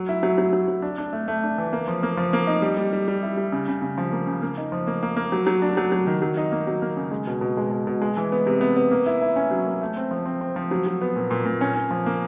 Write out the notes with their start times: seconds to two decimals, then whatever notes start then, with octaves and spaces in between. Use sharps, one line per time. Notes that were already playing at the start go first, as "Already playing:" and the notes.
Already playing: F#3
0.09 E4
0.23 F#3
0.38 F#3
0.53 F#3
0.68 F#3
0.82 D4
0.98 D4
1.13 A3
1.28 A3
1.43 D4
1.58 E3
1.73 A#3
1.88 F3
2.03 A#3
2.17 F3
2.33 A#3
2.47 D#4
2.62 G3
2.77 G3
2.93 G3
3.08 G3
3.23 E4
3.37 G3
3.52 C#3
3.68 C#3
3.82 C#3
3.98 F3
4.12 A#3
4.27 C#3
4.42 A#3
4.58 D#4
4.72 F3
4.87 A#3
5.03 A#3
5.17 A#3
5.32 F#3
5.47 F#3
5.62 D4
5.77 F#3
5.92 F#3
6.07 D#3
6.22 F#3
6.37 D#4
6.52 A#3
6.67 F#3
6.82 A#3
6.97 C#3
7.11 G#3
7.27 B2
7.41 B2
7.57 G#3
7.71 B2
7.87 B2
8.01 G#3
8.17 E3
8.32 B3
8.47 C3
8.61 B3
8.77 B3
8.91 A#3
9.06 E4
9.21 E4
9.36 C#4
9.51 F#3
9.67 A#3
9.82 A3
9.97 C4
10.11 F3
10.26 C4
10.41 C4
10.56 F3
10.71 F#3
10.86 F#3
11.01 B3
11.16 A#2
11.31 A#2
11.45 A#2
11.61 C#4
11.75 C#4
11.91 F3
12.06 A#3